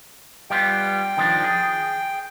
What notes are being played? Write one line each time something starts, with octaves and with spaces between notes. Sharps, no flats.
G3 B3 F4 G5
D#3 F3 D4
G#4